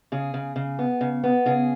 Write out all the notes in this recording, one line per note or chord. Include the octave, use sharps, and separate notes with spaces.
C#3 G#4
C#3
C#3
B3
C#3
B3
C#3 G#4